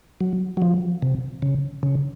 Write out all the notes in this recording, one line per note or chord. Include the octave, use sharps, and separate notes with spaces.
F#3
F#3
F3
C3
C#3
C#3